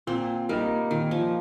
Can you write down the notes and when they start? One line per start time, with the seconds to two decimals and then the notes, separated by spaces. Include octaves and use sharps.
0.07 A#2 C4
0.49 G3 A#3 D#4 A#4
0.91 A#2 D#3
1.11 F3